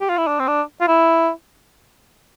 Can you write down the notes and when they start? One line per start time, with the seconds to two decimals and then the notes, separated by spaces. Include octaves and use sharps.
0.01 G4
0.10 F4
0.18 E4
0.27 D4
0.39 C4
0.48 D4
0.81 F4
0.88 E4